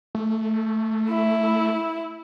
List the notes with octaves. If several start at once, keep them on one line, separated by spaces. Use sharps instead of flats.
A3
E4